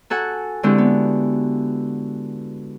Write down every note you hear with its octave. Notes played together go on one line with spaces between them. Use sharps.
F#4 A4 F#5 G#5
D3 G#3 C4 E4 F#4 G4
B3